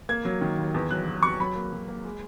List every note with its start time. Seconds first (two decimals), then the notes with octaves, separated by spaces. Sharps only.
0.09 A#3 G#6
0.25 F#3
0.41 D#3
0.58 D#2
0.74 E2
0.91 F#3 F#6
1.07 F#3
1.23 F#3 C#6
1.40 F#3 B5
1.56 A#3
1.73 F#3
1.88 A#3
2.05 G#3